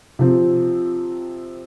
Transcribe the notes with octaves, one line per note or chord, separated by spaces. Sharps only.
C3 F3 C4